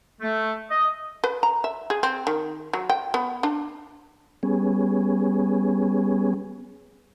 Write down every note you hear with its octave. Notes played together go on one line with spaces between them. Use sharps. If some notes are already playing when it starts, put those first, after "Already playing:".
A3
D#5
B4
A#5
E5
G#4
C4
D#3
F#3
G5
B3
D4
G3 B3 C#4 G#4